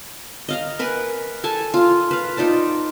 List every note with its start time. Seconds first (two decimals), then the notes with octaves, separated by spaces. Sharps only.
0.48 D#5 F5 A#5
0.79 A#4 B4 F#5 G#5
1.44 A4 G#5 A5
1.74 F4 F5
2.11 B4 F5
2.37 D#4 F4 D5 A5